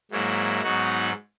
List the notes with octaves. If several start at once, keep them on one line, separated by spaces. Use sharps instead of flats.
G#2 F#3 A#3 E4
G#2 F#3 B3 D#4 F#4